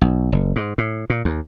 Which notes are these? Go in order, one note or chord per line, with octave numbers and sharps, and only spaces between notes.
B1
F#1
G#2
A2
A#2
D#2